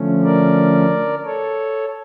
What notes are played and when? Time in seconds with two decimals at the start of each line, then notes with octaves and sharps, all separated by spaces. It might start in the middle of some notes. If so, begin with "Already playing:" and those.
Already playing: D3 F3 A3 C#4
0.24 A#4 D5
1.25 A4 C#5